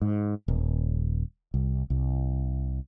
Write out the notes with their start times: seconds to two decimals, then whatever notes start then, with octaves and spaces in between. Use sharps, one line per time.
0.02 G#2
0.48 D#1
1.54 C2
1.90 C2